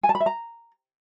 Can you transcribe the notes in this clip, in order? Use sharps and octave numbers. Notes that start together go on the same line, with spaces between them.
G#5
A5
B5
E5
A#5